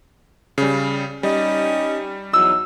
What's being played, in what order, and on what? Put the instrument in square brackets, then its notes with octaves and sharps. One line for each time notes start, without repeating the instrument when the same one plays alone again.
[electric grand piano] C#3 G3
[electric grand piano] G3 [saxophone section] C#4 D#4 G4
[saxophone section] E2 F#3 D#4 [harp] E6